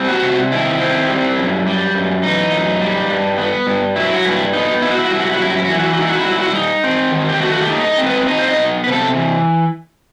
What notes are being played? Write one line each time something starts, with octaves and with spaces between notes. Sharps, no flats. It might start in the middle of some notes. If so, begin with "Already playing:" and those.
Already playing: G3 C4
F#4
C3
D#3 E4
C4
G3
F#2
G3
F#2
E3 D#4
F#2
G3
G2
B3
G2
F#3 E4
F#4
G2 E4
B3 D#4
D#4 E4
F#4
E4
F#4
G3 E4
F#4
E4
F#4
F#2 E4
F#4
E4
F#4
E3 E4
F#4
E4
F#4
D#4 E4
F#4
E4
G3 F#4
E4
F#4
E4
D#4
C4
D#3
G4
A3 F#4
F#4
G4
D#4
D#5
C4
B4
D#4 D#5
C5
D#5
B3
C3 B4
A4
E3